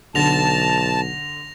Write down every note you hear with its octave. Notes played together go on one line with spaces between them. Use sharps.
B1 D3 A5 A#6 F7